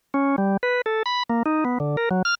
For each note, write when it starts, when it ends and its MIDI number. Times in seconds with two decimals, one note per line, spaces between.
0.14 0.36 61
0.38 0.57 55
0.63 0.81 71
0.86 1.03 69
1.06 1.23 83
1.29 1.43 58
1.46 1.64 63
1.65 1.78 59
1.80 1.96 50
1.97 2.09 70
2.11 2.22 54
2.25 2.35 89